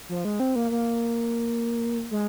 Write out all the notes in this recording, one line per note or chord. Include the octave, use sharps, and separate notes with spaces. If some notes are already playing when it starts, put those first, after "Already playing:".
F3
G#3
C4
A#3
A#3
G#3